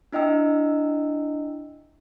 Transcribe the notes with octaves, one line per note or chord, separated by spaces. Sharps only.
D4 E4 D#5 G5 E6